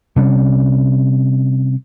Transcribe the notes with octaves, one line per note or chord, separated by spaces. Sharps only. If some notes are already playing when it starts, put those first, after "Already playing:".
C3 G3 C#4